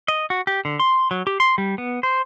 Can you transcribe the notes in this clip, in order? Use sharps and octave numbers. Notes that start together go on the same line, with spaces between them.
D#5
F#4
G4
D3
C6
F#3
G4
C6
G3
B3
C5